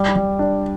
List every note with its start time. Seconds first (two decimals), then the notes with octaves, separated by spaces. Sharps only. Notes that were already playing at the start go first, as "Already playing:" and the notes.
Already playing: G3
0.16 G3
0.39 D4